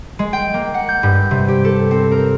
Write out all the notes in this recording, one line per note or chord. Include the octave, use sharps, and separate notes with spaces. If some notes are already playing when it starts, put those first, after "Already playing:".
G#3
G5
A#3
F#5
G6
G2
C3
G4
A4
C4
A#4